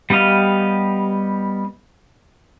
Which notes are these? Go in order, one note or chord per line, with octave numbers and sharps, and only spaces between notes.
G3 B3 G4 D#5 F5